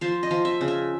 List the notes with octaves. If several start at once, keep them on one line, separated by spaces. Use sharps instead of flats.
F3 C5
D#5
F3
E5
C#3
E5